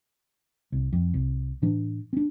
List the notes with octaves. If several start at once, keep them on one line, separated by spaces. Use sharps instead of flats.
C2
F2
C2
A2 E3 D4
C4 D4